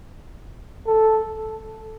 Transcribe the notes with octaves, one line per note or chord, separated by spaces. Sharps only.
A4